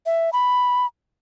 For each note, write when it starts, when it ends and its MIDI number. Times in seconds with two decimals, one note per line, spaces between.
0.06 0.30 76
0.33 0.86 83